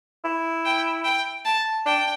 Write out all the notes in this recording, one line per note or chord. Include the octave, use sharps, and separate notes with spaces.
E4
G5
G5
A5
D4 G5